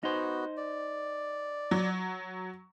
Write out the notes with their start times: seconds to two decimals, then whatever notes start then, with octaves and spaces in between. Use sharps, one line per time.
0.03 B3 D#4 F#4 C5
0.57 D5
1.71 F#3